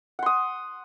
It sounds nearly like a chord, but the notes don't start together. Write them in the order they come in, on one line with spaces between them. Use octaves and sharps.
F#5 C6 D#6